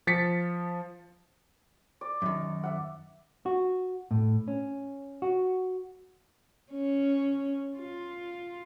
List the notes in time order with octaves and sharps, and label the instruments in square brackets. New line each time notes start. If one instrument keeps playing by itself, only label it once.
[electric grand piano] F3 A6 B6 C#7
[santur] D5
[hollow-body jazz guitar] F#2 D#3
[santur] E5 F#5
[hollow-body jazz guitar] F#4
A2
C#4
F#4
[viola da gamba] C#4
F4